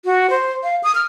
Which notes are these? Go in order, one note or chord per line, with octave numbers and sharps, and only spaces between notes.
F#4
C5
F5
D#6
F6